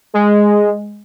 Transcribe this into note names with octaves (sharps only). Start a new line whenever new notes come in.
G#3